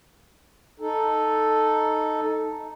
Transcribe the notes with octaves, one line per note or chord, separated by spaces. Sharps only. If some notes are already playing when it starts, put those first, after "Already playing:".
D#4 A4